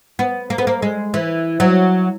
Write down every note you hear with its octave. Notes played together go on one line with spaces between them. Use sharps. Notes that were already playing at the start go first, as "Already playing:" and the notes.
B3
A#3
B3
A#3
G#3
E3
F#3